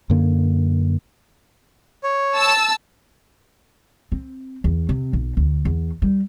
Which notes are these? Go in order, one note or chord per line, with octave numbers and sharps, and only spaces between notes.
F#2 D3 A#3
C#5
A5 E6
C4
E2
C3
B1
D2
E2
G3